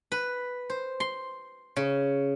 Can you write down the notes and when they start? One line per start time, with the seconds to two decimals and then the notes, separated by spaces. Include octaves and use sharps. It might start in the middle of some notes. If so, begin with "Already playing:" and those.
0.12 B4
0.70 C5
1.00 C6
1.76 C#3